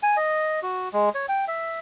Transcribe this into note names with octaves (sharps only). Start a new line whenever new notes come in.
G#5
D#5
F#4
G#3
C#5
G5
E5